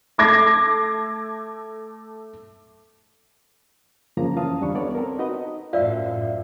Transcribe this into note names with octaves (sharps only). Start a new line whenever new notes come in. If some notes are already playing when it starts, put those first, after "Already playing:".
A3 A4 D6 G#6 A#6 C7
F#2 C#3 F3 A#3 F4 A#5
E3 C#4 F5 A5 D#6
D#2 G3 D4 C#6
B3 A4 C#5 D5
C4 A4 A#4
D#4 F#4 B4 D#5
F#2 A2 F4 C5 D5 E5 F5